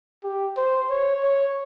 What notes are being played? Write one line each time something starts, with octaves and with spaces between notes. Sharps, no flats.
G4
C5
C#5
C#5